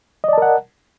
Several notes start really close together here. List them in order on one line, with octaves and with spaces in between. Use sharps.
D#5 D5 A5 A#4 F#5